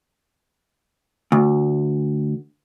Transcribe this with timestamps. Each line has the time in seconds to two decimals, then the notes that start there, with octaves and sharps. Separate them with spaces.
1.32 D2